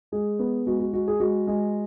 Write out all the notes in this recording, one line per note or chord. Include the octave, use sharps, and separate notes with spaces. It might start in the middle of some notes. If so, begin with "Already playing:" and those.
G#3 G#4
B3
G#3 F#4
F#4
G#3 F#4
G#4
G#3 F#4
G#3